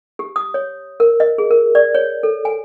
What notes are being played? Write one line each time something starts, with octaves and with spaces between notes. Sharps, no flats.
G4
D#6
C#5
A#4
D#5
G#4
A#4
D5
C#5
A4
G#5